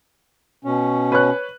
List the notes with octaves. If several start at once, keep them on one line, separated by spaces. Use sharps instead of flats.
B2 C#4
B4 C#5 F#6